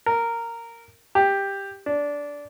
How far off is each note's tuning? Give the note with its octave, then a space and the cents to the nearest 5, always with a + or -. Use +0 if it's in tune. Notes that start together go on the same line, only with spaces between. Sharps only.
A#4 -10
G4 +10
D4 -15